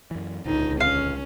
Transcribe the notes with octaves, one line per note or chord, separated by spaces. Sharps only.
F#2 E3
D#1 C#2 D3 D#4
C#4 F5